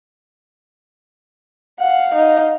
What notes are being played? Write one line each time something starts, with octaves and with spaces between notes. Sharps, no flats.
F5 F#5
D#4